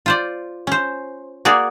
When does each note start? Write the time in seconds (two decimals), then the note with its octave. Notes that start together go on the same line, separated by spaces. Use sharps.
0.06 F4 C5 D5
0.67 C#4 C5
1.45 A#3 F#4 G#4 D5